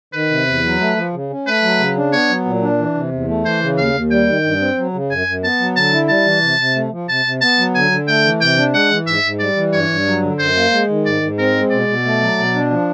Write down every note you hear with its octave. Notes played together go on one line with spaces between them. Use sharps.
D#3 B4
C3
E2
F#3
A3
F3
C#3
C#4
A3 B4
F#3
C#3
D4
B3 C#5
F#3
A#2
D4
E3
C3
E2
A3
E3 C5
C#3
D#2 F5
D#2
G3 G5
D#3
G2
C4
F#3
C#3
F#2 G#5
F#2
B3 A5
F#3
D3 A5
E4
G3 A5
E3
C3
C3
A3
F3
C3 A5
C3
B3 A5
F#3
D3 G#5
D3
A3 G5
E3
C3 G5
D4
G#3 F#5
E3
G#2 E5
G#2
G3 D5
E3
G2 C#5
G2
F#3
D3
F#2 C5
A#3
G#3
D#3
G#2 D5
G#2
C4 A#4
G#3
B2 D5
B2
A3
F#3
B2
D4
F3